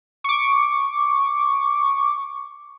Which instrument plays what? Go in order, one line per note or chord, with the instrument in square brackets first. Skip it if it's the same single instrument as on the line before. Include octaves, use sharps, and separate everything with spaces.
[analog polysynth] C#6 D6